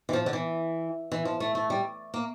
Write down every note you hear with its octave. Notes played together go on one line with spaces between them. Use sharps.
E3
F3
D3
E3
E3
F3
A3
A3
G3
A#3